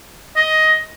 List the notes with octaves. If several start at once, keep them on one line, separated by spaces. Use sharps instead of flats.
D#5